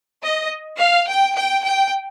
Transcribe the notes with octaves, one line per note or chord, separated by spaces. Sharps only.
D#5
F5
G5
G5
G5